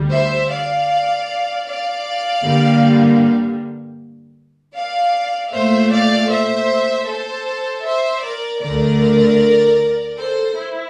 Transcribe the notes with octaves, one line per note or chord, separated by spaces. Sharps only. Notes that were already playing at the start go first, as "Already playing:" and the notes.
Already playing: D2 D3 G3
C5 E5
D5 F5
D5 F5
G2 D3 G3 A#3
D5 F5
A#2 A3 C5 E5
D5 F5
C5 E5
A4 C5
C5 E5
A#4 D5
D2 D3 A3 A#4 D5
A4 C5
E4